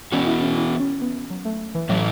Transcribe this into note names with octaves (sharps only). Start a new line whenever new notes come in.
E3 B3 C#4 F#4
E4
C#4
E4
C#4
B3
F#3
A3
E3
A2 E3 F#3 A3 E4